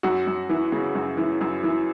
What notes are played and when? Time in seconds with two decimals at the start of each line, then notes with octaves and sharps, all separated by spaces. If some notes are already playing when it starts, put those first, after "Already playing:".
0.03 F#2 F#4
0.27 F#2
0.49 E3
0.72 C#3
0.95 F#2
1.17 E3
1.41 F#2
1.63 E3